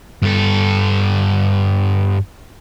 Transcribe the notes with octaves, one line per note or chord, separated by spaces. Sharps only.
G2 A4